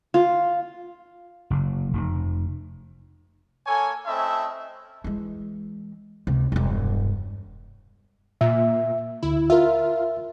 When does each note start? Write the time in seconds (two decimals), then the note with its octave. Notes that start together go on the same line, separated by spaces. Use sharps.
0.14 F4
1.50 F#1
1.93 F1
3.67 A#3 A4 C#5 G#5
4.06 A3 C4 C#4 E4 D#5 E5
5.04 E3 G#3
6.27 C#2 C3
6.52 E1 G2
8.41 A#2 E5
9.23 D2 D3 E4
9.50 F4 A#4 E5